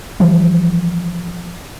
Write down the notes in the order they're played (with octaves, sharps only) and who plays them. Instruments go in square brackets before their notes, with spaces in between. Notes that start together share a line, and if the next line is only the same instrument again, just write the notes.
[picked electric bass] E3 F3 G3